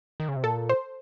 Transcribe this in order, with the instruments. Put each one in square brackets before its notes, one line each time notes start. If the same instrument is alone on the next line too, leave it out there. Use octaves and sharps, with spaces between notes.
[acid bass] D#3
C#3
C3
[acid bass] A#2 [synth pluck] A4
[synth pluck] C5